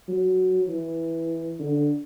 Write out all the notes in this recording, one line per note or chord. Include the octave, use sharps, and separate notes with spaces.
F#3
E3
D3